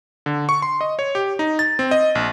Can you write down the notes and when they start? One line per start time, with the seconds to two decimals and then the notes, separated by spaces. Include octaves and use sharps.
0.26 D3
0.49 C#6
0.62 C6
0.81 D#5
0.99 C#5
1.15 G4
1.39 D#4
1.59 A6
1.79 C4
1.91 D#5
2.15 A#1